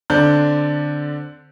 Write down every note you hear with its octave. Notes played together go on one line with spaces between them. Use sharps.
D3 C4 D4 G6